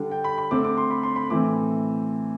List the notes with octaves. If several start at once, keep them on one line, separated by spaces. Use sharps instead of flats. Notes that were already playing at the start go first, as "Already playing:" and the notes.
Already playing: D3 G3 D4
G5
B5
B5
D3 A3 C4 D6
D6
C6
B5
C6
B5
A2 E3 A3 C4 D6